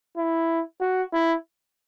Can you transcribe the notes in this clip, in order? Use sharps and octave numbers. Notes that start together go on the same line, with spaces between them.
E4
F#4
E4